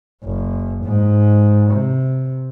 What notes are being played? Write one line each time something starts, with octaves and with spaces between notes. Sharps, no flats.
F#1
G#2
C3